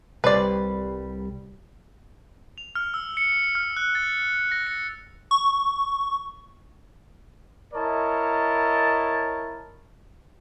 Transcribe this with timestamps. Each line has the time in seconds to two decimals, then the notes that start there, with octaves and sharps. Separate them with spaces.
0.24 C2 G3 B4 C5 D5
2.58 F7
2.75 F6
2.94 E6
3.17 C#7
3.55 F6
3.77 F#6
3.95 A6
4.52 A#6
4.67 C#7
5.31 C#6
7.74 E4 A#4 C#5 D#5 A5